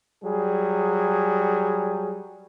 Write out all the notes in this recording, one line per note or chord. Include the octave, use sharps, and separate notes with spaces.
F#3 G3 G#4